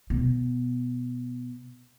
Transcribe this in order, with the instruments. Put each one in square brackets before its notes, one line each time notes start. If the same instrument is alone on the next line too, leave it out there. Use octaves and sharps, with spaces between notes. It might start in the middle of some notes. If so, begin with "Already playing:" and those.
[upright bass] B2 B3